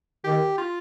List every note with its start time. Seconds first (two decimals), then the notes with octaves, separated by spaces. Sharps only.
0.24 D#3 G4
0.58 F4